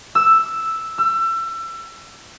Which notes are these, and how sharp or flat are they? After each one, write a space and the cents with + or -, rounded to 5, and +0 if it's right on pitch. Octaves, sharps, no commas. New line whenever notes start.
E6 +0
E6 +30